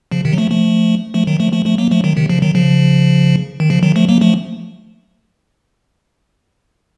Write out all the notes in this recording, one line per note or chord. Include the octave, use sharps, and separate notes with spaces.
C#3 F3
C3 D#3
F#3
F3 A3
F3 A3
F3 A3
D#3 F#3
F3 A3
F3 A3
F3 A3
F#3 A#3
F3 A3
D#3 F#3
C3 D#3
C#3 F3
D#3 F#3
C#3 F3
D#3
C#3 F3
D#3 F#3
F3 A3
F#3 A#3
F3 A3